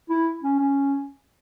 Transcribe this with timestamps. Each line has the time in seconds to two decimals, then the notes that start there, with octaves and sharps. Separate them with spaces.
0.10 E4
0.43 C#4
0.59 C#4